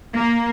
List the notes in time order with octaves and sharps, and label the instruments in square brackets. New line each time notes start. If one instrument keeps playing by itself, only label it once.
[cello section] A#3